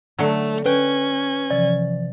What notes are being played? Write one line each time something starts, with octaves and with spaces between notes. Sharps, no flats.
D3 F#3 A3
C#4 B4 G5 G#6
C3 E3 F3 D5